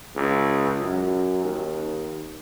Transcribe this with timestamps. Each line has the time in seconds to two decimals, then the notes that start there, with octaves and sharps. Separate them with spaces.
0.16 C#2
0.82 F#2
1.44 D#2